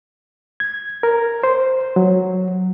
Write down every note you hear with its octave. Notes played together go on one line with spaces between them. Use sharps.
G#6
A#4
C5
F#3